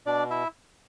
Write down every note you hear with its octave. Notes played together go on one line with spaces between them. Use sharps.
B2 D4 D5
E4 E5